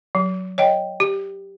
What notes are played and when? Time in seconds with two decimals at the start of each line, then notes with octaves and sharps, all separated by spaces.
0.15 F#3
0.58 C#5 D#5 G5
1.00 G4